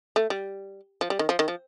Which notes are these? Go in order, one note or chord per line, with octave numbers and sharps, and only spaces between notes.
A3
G3
F3
G3
D#3
F3
D#3
F3